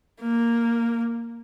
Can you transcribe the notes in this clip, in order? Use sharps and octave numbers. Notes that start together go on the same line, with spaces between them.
A#3